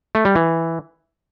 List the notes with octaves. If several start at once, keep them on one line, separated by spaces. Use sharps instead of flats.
A3
G3
E3